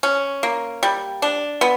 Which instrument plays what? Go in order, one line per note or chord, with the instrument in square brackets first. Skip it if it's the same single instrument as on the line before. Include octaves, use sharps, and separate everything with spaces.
[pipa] C#4
A#3
G3
D4
B3